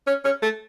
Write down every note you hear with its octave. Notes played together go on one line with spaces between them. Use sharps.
C#4
C#4
A3